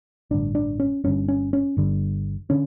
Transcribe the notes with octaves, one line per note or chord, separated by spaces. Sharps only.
A1 G2 D3 D4
D4
C#4
G1 G2 D3 C#4
C#4
C#4
G1 G2 D3
D3 C#4